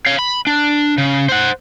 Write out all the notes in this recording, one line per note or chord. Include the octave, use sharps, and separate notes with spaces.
C#5 F5
B5
D4
C#3
C5 F#5